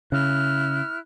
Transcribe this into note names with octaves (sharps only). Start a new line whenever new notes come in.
C#3 E4 F6 F#6